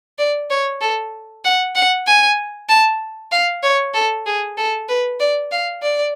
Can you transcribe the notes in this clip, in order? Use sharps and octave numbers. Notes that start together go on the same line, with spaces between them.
D5
C#5
A4
F#5
F#5
G#5
A5
F5
C#5
A4
G#4
A4
B4
D5
F5
D5